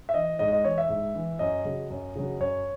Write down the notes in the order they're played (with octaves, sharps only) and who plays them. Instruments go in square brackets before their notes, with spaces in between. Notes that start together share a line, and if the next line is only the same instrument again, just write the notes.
[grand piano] E5
E3 D#5
G#2 D#5
D#5
E3 C#5
E5
G#2
E3
F#2 D#5
C#3 F#3
F#2
C#3 F#3
F#2 C#5